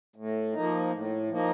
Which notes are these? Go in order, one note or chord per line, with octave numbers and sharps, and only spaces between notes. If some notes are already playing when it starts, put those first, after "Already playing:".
A2
F3 A#3 D#4
A2
F3 A#3 D#4